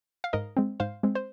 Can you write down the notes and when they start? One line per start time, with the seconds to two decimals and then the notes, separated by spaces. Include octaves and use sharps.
0.24 F5
0.33 G#2 A#4 D#5
0.57 G#3 C4
0.80 G#2 C5 F5
1.03 G#3 C4
1.15 C5